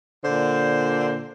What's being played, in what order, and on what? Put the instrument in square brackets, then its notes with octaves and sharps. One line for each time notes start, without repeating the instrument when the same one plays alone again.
[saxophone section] A#2 D3 C5